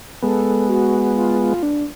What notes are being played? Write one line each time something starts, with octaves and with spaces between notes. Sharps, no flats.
G#3 B3 A4
F#4
F4
F4
D4